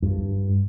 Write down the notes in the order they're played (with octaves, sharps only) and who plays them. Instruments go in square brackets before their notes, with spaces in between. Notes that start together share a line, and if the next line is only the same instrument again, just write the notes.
[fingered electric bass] G2